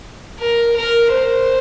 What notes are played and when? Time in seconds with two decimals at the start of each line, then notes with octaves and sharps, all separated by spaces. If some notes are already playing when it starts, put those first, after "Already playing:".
0.39 A#4
0.77 A#4
1.13 C5